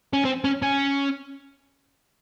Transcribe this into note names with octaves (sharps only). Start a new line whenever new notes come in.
C#4
C4
C#4
C#4